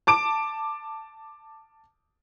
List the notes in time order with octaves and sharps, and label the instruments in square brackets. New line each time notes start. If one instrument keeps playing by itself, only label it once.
[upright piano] A5 D6 D7